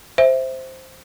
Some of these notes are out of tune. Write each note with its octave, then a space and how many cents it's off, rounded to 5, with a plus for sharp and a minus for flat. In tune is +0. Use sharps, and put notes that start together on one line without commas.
C5 +0 E5 -5